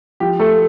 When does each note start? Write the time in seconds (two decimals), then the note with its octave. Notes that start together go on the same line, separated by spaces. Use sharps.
0.20 F3 G4
0.40 A3 A4